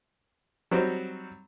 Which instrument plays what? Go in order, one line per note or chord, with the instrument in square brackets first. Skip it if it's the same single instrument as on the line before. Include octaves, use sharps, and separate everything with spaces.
[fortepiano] F#3 G3 C4 D#4